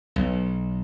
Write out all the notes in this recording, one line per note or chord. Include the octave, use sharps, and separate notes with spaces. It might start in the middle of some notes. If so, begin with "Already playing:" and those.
B1